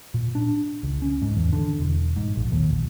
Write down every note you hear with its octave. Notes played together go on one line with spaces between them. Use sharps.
A#2
D4
C#2
C#4
G#2
E2
D3
E1
G#2
A#1
D#2
A#1